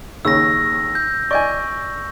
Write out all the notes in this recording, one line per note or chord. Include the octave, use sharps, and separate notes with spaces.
D#2 C#3 E6 A#6
G6
D5 D#5 G#5 C#6 G6